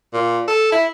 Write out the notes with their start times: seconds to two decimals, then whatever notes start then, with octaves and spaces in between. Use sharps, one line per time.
0.13 A#2
0.48 A4
0.72 E4